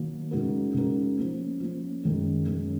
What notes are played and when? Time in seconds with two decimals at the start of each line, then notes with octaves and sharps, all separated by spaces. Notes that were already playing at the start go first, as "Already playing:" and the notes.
Already playing: D#3 F#3 A#3
0.31 C#3 G#3 D#4 F#4 A#4
0.74 C#3 G#3 D#4 F#4 A#4
1.17 F3 A#3 C#4
1.60 F3 A#3 C#4
2.03 F#2 D#3 G#3 C#4
2.46 F#2 D#3 G#3 C#4